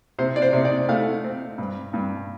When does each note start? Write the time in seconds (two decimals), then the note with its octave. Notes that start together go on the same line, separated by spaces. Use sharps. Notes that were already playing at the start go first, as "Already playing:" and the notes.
0.19 C3 C5
0.36 D5
0.42 C5
0.53 C3
0.65 D5
0.89 A3 F5
1.24 C4
1.58 G2
1.93 G2